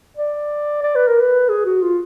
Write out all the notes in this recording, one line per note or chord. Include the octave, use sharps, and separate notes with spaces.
D5
D5
B4
A#4
B4
G#4
F#4
F4